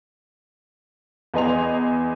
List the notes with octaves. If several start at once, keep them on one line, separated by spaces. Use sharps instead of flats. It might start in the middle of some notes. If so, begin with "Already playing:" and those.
E2 B4 D#5 G#5 C6 F7